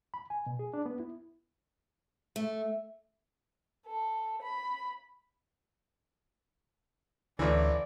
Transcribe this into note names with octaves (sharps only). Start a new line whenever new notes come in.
B5
G#5
B2
G#4
D4
B3
E4
A3
A4
B5
A1 D2 E3 D5